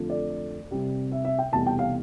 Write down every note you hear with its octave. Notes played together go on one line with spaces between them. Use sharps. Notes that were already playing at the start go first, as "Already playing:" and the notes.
Already playing: F2 D3 F3 A3
D5
C2 C3 G3
E5
E5
G5
F1 E2 B2 G3 A5
G5
F5